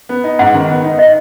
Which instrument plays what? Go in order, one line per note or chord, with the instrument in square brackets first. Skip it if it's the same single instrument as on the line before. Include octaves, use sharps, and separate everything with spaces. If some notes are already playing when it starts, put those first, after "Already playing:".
[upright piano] B3
D#4
[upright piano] G#2 [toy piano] F#5
[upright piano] D#3
B3
D#4
[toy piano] D#5